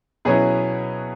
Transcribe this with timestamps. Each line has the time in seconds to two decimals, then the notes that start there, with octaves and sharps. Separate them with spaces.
0.25 B2 F#3 C#4 E4 G#4 B4